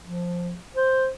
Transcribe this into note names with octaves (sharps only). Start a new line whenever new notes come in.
F3
C5